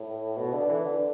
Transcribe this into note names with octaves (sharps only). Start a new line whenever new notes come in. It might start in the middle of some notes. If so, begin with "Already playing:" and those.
Already playing: A2
B2
D3
E3
D3